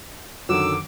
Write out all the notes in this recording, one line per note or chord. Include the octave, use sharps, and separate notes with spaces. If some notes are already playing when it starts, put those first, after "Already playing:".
F#2 D3 D#3 F#3 D6 E6